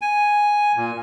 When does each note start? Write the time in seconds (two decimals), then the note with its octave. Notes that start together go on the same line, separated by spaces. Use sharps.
0.02 G#5
0.76 A#2